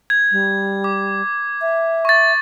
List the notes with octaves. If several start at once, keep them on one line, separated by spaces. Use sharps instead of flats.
G#6
G3
D6
E5
C#6 A6